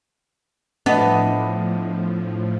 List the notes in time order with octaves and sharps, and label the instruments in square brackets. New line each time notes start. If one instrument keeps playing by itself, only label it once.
[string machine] A2 F3 [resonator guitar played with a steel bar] A3 [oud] B3 [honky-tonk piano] D4 D#5